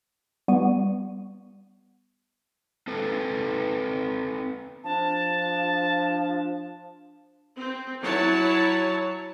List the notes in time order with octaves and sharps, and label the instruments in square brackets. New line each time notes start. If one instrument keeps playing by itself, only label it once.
[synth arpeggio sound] G3 B3 C#6 D#7
[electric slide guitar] C4 A4 B4
[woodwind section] F3 D4 [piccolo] A5
[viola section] C4
F#3 E4 C#5 A5